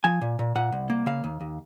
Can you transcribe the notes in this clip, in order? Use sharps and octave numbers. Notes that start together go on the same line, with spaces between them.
F3 G#5
A#2
A#2
A#2 F#5
C2
A#3
C#3 F5
D#2
D#2